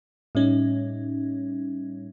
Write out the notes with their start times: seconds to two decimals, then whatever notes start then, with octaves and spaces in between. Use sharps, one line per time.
0.35 A2 G3 C#4 D#4